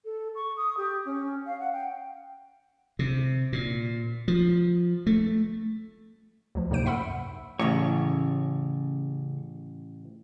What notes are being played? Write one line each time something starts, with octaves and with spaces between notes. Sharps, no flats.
A4
C#6
D#6
G4
C#4
F5
F#5
G5
C3
A#2
F3
A3
D2 F3
B1 G#2 C3 A#3 C5 D7
F#2 E5 F#5 B5 E6
A1 C#3 C#5